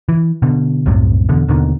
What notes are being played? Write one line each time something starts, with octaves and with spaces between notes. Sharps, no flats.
E3
B2 D3
C2 F#2 A2 C3
E2 B2 D3
D#2 B2 D3 D#3